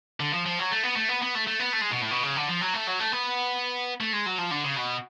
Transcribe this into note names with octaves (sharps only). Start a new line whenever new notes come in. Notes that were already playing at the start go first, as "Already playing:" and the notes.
D3
F3
F3
F#3
A3
B3
A3
B3
B3
A3
A3
B3
A3
G#3
B2
A2
B2
C#3
D3
F3
F#3
A3
F#3
A3
B3
A3
G#3
F#3
F3
D3
C#3
B2